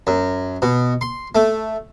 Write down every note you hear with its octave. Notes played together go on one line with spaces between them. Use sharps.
F#2
B2
C6
A3